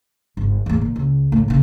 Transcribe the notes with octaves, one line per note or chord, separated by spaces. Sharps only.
G1
E2 A2
A#2
C#2
A2 E3
A#2 C#3